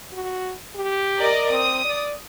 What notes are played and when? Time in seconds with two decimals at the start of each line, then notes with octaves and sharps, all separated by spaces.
0.13 F#4
0.75 G4
1.19 A#4 D5 D#5
1.50 C4 D#6
1.85 D5